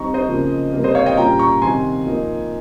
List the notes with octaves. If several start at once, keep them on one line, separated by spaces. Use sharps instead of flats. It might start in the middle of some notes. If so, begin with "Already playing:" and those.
Already playing: G3 C4 D#4 A#5 C#6
C5 D#5
C#3 F3 A#3
C3 G3 A#3
C5 D#5
C#5 F5
D#5 G5
A#2 G3 C#4 F4 G5 A#5
A#5 C#6
C3 D#3 G3 G#5 C6
F3 A#3 D#4